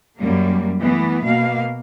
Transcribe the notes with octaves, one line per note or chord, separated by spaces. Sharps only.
F#2 G3 A#3
E3 A3 B3
B2 A#3 F5